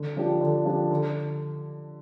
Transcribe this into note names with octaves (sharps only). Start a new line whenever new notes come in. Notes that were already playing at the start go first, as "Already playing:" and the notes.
Already playing: D3
F3 D4 G4
D3
F3 D4 G4
D3